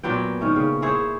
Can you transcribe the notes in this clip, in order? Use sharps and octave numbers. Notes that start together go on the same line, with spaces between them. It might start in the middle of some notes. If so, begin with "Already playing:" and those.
A#2 F#3 B3 G5
D#3 C#4 E4
C#3
E4 G#4 C5 C#5